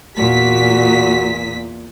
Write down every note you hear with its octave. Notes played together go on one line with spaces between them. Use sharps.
E2 A#2 F#4 B6